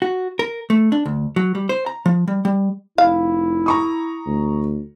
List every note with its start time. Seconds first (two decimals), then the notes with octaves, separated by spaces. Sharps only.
0.02 F#4
0.39 A#4
0.70 A3
0.92 D4
1.06 D2
1.36 F#3
1.55 G3
1.69 C5
1.86 A#5
2.06 F3
2.28 G3
2.45 G3
2.98 F1 E4 F5
3.66 A#5 C#6 D#6
4.26 D2